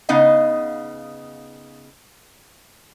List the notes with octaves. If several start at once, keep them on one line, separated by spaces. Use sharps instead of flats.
C#3 B3 D#4 D#5 F5